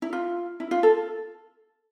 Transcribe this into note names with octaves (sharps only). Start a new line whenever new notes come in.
E4
F4
E4
F4
A4